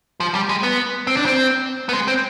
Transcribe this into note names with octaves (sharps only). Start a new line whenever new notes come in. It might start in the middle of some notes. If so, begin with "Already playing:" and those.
F3
G3
G#3
B3
C4
D4
C4
B3
G#3
C4